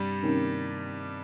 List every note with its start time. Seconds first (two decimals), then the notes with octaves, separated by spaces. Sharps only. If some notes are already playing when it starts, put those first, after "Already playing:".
Already playing: G2 C3 G3
0.23 C3 D#3 A#3 C#4